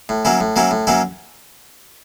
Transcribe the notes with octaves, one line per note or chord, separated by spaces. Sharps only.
A2
F#3 A#3 C#4 E4
A2
F#3 A#3 C#4 E4
A2
F#3 A#3 C#4 E4